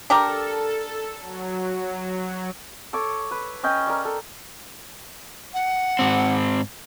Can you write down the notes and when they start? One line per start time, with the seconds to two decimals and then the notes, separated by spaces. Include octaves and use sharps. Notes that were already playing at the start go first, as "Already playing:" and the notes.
0.10 D4 G4 A4 A#4
1.20 F#3
2.93 A4 C#5 D6
3.31 B4
3.63 C#4 D#5 G5
3.87 A#4 D5
4.05 A4
5.54 F#5
5.99 G#2 C4